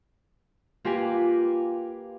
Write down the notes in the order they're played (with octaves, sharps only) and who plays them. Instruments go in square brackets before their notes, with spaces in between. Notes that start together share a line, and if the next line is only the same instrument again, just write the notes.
[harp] A#3 F4 G4 B4 F5 G#5